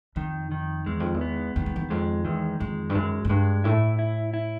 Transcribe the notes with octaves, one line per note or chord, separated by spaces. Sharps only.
F2 D#3
D#3
E2 G#3
F2
E2
B3
E2 D#3
F2
E2
F2 G#3
E2 D#3
F2 G#3
G2
F#2 G#3
F#2
G2 G#3
A2 E4
E4
E4